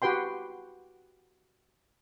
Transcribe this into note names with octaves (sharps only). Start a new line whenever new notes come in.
F#4 G4 B4 G5 C6